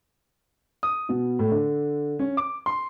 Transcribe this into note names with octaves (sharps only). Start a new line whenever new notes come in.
D#6
B2
A2
D3
C#4
D6
C6